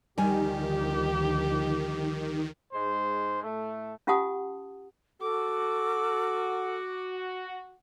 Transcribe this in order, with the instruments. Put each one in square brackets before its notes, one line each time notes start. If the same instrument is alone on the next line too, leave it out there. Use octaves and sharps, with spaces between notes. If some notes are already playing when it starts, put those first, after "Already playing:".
[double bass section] D2 D3 F3 [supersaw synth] D#3 [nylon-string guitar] G3 G#5 [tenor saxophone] G4
[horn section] G#2 G#3 C5
A2 A3
[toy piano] C#4 F4 G4 F#5 A5 D#6
[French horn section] F#4 [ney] A4 [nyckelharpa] D6